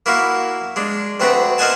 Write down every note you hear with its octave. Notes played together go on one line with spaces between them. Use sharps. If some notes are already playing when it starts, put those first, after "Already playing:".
A#3 E4 F#4 F5
G#3 D4
D2 C4 D4 F#4 B4 A#5
A#4 C5 D#5 F#5 G#5 A5